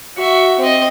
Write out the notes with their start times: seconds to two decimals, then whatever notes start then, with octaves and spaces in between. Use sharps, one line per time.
0.17 F#4 E5
0.59 C4 D#5